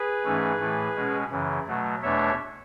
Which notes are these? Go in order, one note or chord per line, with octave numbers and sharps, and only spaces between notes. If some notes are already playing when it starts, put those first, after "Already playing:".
Already playing: G#4 B4
G#2 E3 A3 C#4
A2 E3 A3
B2 G#3 C#4
F#2 C#3 E3
B2 F#3 A3
E2 B2 A3 D4 C#5 E5